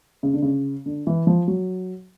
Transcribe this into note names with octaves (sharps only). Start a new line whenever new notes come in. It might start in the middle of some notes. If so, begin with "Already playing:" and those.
C#3
D3
C#3
D3
E3
F3
F#3